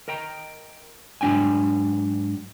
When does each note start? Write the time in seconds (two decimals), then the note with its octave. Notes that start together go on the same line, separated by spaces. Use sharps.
0.08 A#4 D#5 G5 A#5
1.21 G#2 F#3 D4 G5 G#5